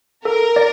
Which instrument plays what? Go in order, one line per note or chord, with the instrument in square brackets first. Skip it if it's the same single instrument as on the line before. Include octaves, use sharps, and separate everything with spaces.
[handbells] A4 [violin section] A#4
[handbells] D5